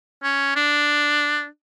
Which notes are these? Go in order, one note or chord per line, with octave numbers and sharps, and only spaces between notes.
C#4
D4